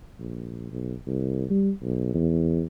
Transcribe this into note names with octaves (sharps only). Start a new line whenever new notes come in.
A#1
B1
C2
G3
B1
E2